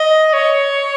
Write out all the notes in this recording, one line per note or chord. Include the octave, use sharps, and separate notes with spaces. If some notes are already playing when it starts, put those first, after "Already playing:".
Already playing: D#5
C#5